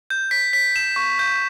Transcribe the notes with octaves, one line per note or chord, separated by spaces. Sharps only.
G6
B6
B6
E7
C#6
G6